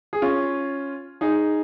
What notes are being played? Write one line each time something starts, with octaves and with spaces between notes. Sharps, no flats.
G#4
C#4 F4
D#4 G#4